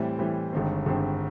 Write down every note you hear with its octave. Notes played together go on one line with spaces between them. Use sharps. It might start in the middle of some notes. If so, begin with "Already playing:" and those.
Already playing: A2 E3 G3 C4
A2 E3 G3 C4
G1 G2 D#3 G#3 C4
G1 G2 D#3 G#3 C4